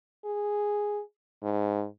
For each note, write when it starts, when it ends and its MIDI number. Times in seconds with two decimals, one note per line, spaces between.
0.25 1.02 68
1.43 1.86 44